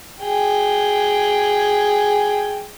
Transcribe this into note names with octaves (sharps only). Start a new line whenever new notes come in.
G#4 G5